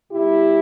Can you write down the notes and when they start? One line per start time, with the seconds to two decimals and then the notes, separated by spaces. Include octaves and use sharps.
0.11 B2 G3 E4 G4